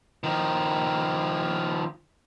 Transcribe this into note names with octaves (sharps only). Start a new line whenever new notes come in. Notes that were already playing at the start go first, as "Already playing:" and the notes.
D#3 F3